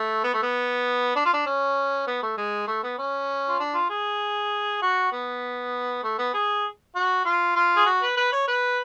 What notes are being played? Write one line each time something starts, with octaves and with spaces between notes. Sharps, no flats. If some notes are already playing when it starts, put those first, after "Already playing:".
Already playing: A3
B3
A3
B3
D4
F4
D4
C#4
B3
A3
G#3
A3
B3
C#4
F4
D4
F4
G#4
F#4
B3
A3
B3
G#4
F#4
F4
F4
G#4
F#4
B4
B4
C#5
B4